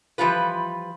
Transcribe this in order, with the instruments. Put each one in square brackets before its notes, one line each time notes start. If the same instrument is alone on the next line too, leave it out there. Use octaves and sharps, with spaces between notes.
[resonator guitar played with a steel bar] E3 F3 G3 F4 B4